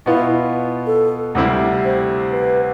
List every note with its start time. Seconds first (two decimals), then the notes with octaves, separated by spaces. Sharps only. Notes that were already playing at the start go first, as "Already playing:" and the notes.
0.06 B2 B3 E4 F4
0.87 A4
1.35 D2 C3 G3 C4 E4
1.84 C5
2.31 B4